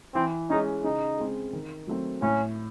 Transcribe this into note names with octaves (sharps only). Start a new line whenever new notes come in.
E3 C4
G#3 C#4 D#4
C#3 D#4
G#3 C4
D#3
F#3 A3 C4
A2 C#4